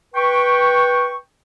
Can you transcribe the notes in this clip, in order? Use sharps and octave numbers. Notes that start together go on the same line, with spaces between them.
B4 G5 C#6